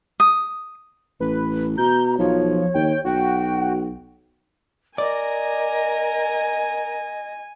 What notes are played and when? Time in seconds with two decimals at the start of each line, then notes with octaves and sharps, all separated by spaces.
0.20 D#6
1.20 A1 B4
1.78 B2 A#5 G6
2.19 B1 F3 C#5
2.74 D#2 G5
3.05 B1 F#4 G5
4.98 A#4 D5 D#5 G#5